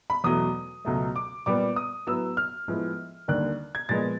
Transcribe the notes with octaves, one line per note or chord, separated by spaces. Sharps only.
B5
E2 B2 F#3 A3 D#6
C#2 B2 F#3 A3
D6
A#2 G3 B3 D6
D#6
A2 F#3 B3 E6
F6
A2 F3 G#3 B3
D#2 D3 G3 A#3 F#6
G#6
A#2 F3 G#3 B3 A6